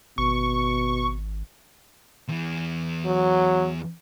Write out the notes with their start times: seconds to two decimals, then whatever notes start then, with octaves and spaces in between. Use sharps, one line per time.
0.18 G#1 B2 C#6
2.29 E2 E3
3.06 F#3